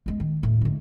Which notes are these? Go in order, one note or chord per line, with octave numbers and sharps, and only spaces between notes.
E2 G#3
D#3
D#2 A2
D2 G#2